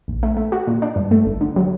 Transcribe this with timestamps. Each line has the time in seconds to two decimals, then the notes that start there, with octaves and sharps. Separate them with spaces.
0.08 A#1
0.23 A3
0.37 A3
0.52 F#4
0.67 A#2
0.82 D4
0.96 G2
1.11 A3
1.26 G1
1.41 D3
1.56 F#3